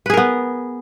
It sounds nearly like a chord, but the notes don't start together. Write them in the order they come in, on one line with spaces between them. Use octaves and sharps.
B4 G#4 A#4 B3